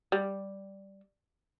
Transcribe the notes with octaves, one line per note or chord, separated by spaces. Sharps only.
G3